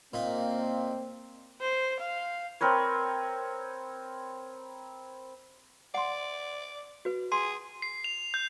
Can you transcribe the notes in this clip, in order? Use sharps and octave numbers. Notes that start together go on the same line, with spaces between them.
A#2 A#3 C4 D#4
C5
F5
C4 A#4 B4 C#5
D5 F#5 C6
F#4 B4
G#4 C6
C7
F7
G6